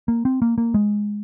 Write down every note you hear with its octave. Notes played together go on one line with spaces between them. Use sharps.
A#3
C4
A#3
A#3
G#3